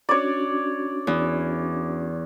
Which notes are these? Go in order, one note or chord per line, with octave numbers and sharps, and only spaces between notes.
C#4 D4 F#4 C#5 D5
E2